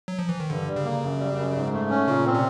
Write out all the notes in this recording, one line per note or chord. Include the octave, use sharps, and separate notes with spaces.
F#3
F3
E3
D#3
G2 D3
G3
C#3
A#3
F#2
G3
F#2
G#2
A3
C#4
A#2 C#3
C4
C3